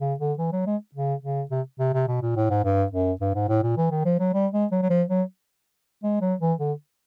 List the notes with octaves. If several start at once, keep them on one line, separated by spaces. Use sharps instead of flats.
C#3
D3
E3
F#3
G#3
C#3
C#3
C3
C3
C3
B2
A#2
A2
G#2
G2
F#2
G2
G#2
A2
A#2
E3
D#3
F3
F#3
G3
G#3
F#3
F#3
F3
F#3
G#3
F#3
E3
D3